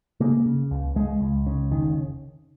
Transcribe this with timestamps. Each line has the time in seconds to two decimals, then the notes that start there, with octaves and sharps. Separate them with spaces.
0.20 C#3 A#3
0.46 C#3
0.71 C#2
0.95 C#2 G#3
1.21 C#2
1.47 C#3
1.71 F1 D#3